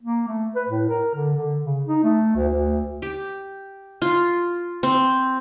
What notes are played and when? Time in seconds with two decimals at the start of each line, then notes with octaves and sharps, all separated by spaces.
0.03 A#3
0.28 A3
0.55 B4
0.69 A2
0.89 A#4
1.15 D3
1.36 D3
1.63 C#3
1.87 D#4
2.04 A3
2.36 D2
2.48 D2
3.02 G4
4.02 F4
4.83 C4